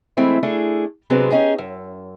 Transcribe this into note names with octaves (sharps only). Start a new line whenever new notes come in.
E3 G#3 A3 C4 E4
A3 D4 E4 G#4
C3 F#3 G#3 B3 C4 D4
C#4 D#4 G4 G#4
F#2